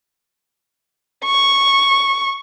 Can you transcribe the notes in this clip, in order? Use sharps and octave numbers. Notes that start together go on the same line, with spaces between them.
C#6